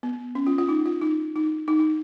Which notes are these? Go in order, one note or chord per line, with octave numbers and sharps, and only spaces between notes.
B3
C#4
F4
F4
D#4
F4
D#4
D#4
D#4
D#4